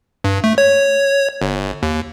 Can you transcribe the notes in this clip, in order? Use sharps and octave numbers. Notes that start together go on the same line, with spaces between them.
G2
A3
C#5
G1
D#2